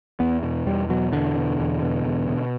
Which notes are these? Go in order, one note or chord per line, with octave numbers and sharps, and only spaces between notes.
E2 B3
B2
E2 G3
B2 F#3
E2 D3
B2
E2
B2
E2
B2